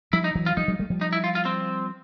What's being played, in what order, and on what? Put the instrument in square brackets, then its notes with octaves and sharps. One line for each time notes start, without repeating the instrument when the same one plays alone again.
[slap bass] F3 G3 [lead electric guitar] E4
[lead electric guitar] D#4
[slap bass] E3 F#3
[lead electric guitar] F4
[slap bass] F3 G3 [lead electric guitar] D#4
[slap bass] F#3 G#3
G3 A3
F3 G3
[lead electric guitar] D#4
E4
F4
F4
C4